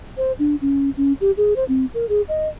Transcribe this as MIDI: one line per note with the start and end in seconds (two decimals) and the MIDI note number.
0.17 0.32 72
0.39 0.55 62
0.62 0.90 61
0.97 1.13 61
1.21 1.31 67
1.37 1.54 68
1.56 1.64 72
1.69 1.85 60
1.94 2.06 70
2.09 2.22 68
2.28 2.48 75